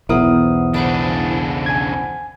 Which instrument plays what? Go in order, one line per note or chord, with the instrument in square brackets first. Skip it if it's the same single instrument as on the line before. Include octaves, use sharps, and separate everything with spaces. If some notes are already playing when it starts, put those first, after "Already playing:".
[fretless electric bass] B1 E2 [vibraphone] B3 C5 F#5 [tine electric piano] E4 A#4 D#6
[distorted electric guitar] C#3 D4 [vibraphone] C5 F#5 B5
[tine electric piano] G#5 G#6